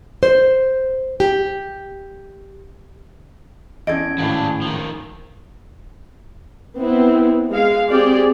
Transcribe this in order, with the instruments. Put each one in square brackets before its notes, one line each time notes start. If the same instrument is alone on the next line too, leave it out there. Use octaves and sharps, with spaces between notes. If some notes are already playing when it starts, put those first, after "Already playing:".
[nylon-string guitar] C5
G4
[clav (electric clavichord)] E2 [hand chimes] C#4 G#6 D7 [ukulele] A4 D5 D#5
[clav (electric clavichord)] G#1 A2 [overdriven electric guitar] C#3 D4
[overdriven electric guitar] D#3 F3
[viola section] B3 C4 E4
G#3 F5
C4 G4 G#4 D5